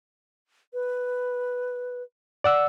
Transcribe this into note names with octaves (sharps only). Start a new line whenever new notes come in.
B4
D5 F#5 E6